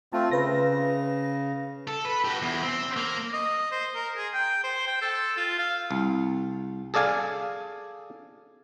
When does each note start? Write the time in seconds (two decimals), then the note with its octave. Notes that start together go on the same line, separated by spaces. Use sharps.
0.13 A3 C4 F4 A5
0.32 C#3 B4 A#6
1.87 A4
2.05 B4
2.25 F#4 G4
2.42 E2
2.62 C4
2.97 A#3
3.34 D#5
3.72 C5
3.95 A#4
4.17 G#4
4.34 G5
4.64 C5
4.87 G5
5.01 A4
5.37 F4
5.58 F5
5.91 C2
6.94 G#4 A4 D5 F5 G#5